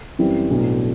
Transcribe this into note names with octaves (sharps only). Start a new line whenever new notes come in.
F#2 E3 G3 C4
B1 A2 F#3 B3 D4